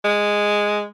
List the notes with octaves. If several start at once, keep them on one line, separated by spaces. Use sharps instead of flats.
G#3